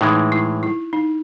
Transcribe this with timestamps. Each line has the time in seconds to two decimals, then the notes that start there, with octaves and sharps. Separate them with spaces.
0.01 A2 E3 G#3 D#4
0.32 E4
0.63 E4
0.93 D#4